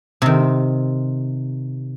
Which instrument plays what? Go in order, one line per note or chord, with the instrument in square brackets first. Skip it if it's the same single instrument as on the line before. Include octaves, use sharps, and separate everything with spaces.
[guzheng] C3 D#3